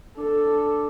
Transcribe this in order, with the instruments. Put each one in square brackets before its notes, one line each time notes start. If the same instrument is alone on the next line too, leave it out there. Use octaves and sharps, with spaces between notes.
[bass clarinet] D4 [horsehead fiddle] A4